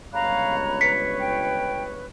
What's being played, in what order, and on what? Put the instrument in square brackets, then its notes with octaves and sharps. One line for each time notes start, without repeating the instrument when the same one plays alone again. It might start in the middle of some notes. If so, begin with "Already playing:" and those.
[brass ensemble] G1 C#2 C#5 [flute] F5 [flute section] A#5 B5 F#6
[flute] B4 [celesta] B6 C#7
[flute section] G5